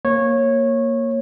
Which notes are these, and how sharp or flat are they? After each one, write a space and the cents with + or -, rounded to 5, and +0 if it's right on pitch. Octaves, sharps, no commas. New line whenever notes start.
A#3 +0 C#5 -15